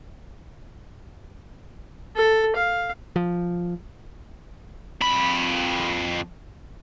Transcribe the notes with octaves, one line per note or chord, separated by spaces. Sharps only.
A4
F5
F3
F2 B5